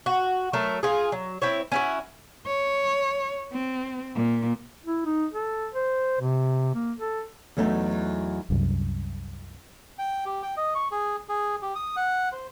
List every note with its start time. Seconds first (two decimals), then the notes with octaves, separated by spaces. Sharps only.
0.06 F#4
0.53 F#3 A3 A4 A#4
0.83 F4 G#4
1.12 F#3
1.42 C4 E4 C#5
1.72 C#4 E4 F#4
2.46 C#5
3.52 C4
4.15 A#2
4.86 E4
5.06 D#4
5.33 A4
5.74 C5
6.21 C3
6.75 A#3
6.99 A4
7.57 E2 F#3 A3 D#4
8.50 C2 F#2
9.99 G5
10.26 G4
10.43 G5
10.57 D#5
10.75 C#6
10.92 G#4
11.29 G#4
11.62 G4
11.75 D#6
11.96 F#5
12.32 C5